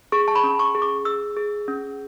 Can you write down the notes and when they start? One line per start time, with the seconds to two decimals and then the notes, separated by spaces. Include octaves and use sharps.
0.12 G#4 C#6
0.28 A5
0.35 B5
0.44 C#4
0.59 C#6
0.75 G#4
0.82 D6
1.05 G#4 E6
1.37 G#4
1.68 C#4